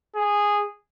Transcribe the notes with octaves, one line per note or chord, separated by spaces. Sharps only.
G#4